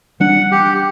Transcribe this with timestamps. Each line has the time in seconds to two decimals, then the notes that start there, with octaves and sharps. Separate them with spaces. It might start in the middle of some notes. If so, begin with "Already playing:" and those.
0.20 E3 G3 D4 F#5
0.52 G4